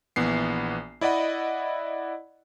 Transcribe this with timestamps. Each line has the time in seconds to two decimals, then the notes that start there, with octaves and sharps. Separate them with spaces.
0.16 A#1 E3 B3 C7
1.01 E4 D5 D#5 F#5 B5